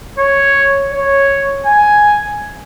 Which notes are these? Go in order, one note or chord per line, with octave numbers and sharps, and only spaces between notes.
C#5
C#5
G#5